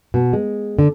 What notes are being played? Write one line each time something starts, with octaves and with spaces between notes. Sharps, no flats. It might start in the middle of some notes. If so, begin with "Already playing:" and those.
B2
G#3
D3